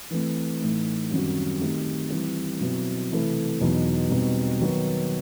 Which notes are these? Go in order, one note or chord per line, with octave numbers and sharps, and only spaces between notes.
E3 A3 C4
A2 E3 A3 D#4
F#2 D#3 G3 C4 F#4
D#3 A3 C4 D#4 G4
E3 G3 C4 E4 G4
B2 F#3 C4 E4
C3 E3 A3 E4 A4
E2 B2 F#3 B3 D#4
B2 G3 C4 D#4 F#4
D#3 F#3 B3 F#4 B4